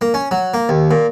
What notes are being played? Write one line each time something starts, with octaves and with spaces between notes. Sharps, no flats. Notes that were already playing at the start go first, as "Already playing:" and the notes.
A#3
C#4
F#3
A#3
D#2
A#2